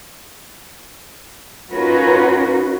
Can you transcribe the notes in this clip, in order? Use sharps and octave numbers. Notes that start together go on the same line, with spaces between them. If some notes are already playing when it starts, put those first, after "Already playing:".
C#4 D#4 F4 F#4 A#4 B4